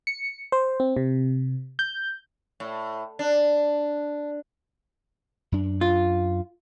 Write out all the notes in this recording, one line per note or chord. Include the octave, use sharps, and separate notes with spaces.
C#7
C5
C4
C3
G6
A2
D4
F#2 D4
F4